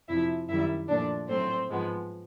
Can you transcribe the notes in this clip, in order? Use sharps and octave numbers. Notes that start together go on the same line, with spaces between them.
F2 C3 F3 E4 E5
F#2 D#3 G3 E4 E5
A#2 F3 A3 D4 D5
A2 F#3 A3 C4 C5
G#2 F3 G#3 B3